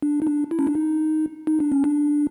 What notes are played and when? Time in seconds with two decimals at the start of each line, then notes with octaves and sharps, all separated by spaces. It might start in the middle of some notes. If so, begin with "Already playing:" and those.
0.02 D4
0.22 D#4
0.27 D4
0.51 E4
0.59 C#4
0.67 D4
0.75 D#4
1.47 D#4
1.60 D4
1.72 C#4
1.84 D4